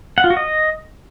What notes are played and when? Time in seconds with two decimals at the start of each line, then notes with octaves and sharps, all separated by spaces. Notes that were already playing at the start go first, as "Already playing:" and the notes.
0.18 F#5
0.24 F4
0.30 F#4
0.37 D#5